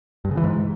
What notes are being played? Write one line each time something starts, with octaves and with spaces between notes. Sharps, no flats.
G2
C#3
E3
G#2